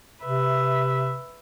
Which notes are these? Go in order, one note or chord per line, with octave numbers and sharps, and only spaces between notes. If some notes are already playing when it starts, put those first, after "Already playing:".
C3 B4 E5